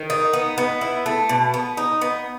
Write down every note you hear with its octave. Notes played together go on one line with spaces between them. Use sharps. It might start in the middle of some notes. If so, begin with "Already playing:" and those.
Already playing: D#3
D#4
B3
B3
E4
A3
B2
B3
D#4
B3